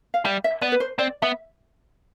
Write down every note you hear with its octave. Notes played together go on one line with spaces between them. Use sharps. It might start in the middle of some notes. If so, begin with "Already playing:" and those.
F5
G3 E5
E5
B3 D5
B4
C5
C4 D5
B3 E5